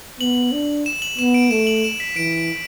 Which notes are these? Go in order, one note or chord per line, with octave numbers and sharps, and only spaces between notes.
B3 F#7
D4
E7
F#7
B3 E7
D7
A3 E7
F#7
E7
B6
E3 D7